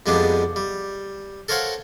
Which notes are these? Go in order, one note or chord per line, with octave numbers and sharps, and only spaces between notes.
F2 G3 G#3 B3 D4
G3
A4 A#4 C5 C#5 F5 F#5